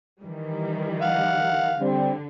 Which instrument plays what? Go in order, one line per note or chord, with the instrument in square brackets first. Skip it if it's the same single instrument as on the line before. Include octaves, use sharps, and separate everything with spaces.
[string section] D#3 E3 G3
[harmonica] F5 F#5
[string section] D3 [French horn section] G3 C4